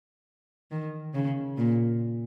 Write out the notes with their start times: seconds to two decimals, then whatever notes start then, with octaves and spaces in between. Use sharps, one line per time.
0.71 D#3
1.14 C#3
1.58 A#2